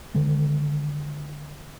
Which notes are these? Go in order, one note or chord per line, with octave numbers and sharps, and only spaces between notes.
D3 D#3 G#3